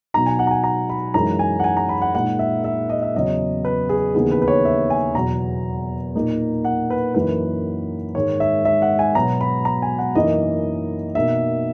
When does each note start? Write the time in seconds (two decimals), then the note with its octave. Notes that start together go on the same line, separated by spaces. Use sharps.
0.14 B2 F#3 B3 D#4 A#5
0.26 G#5
0.39 F#5
0.47 A#5
0.51 G#5
0.64 A#5
0.89 B5
1.14 F#2 E3 G#3 D#4 A#5
1.39 G#5
1.59 F#5
1.64 G#5
1.77 A#5
1.89 B5
2.02 F#5
2.14 A#2 G#3 D#4 F#5
2.39 E5
2.64 E5
2.89 D#5
3.02 E5
3.14 E2 C#3 F#3 B3 D#5
3.65 B4
3.89 G#4
4.15 D#2 C#3 E3 B3 D#4 G#4
4.31 B4
4.42 B4
4.48 C#5
4.65 E5
4.90 G#5
5.15 E2 B2 F#3 A#5
6.15 A#2 A#3 D#4
6.65 F#5
6.90 B4
7.15 F#2 E3 A#3 D#4 B4
8.15 G#2 D#3 G#3 C#5
8.40 E5
8.65 E5
8.82 F#5
8.99 G#5
9.15 B2 F#3 B3 A#5
9.41 B5
9.65 A#5
9.82 G#5
9.98 F#5
10.15 F#2 E3 A#3 D#4 D#5
11.15 B2 A#3 D#4 E5